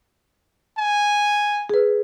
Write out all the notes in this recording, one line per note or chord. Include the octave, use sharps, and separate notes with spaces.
G#5
G#4 B4